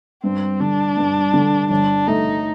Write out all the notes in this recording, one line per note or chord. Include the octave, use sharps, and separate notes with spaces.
G2 C4
D3 D4
G2
D3
G1 D4
A3 D#4